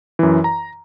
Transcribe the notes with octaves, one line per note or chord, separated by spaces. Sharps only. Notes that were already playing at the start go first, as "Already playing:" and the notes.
F#2 E3
A#5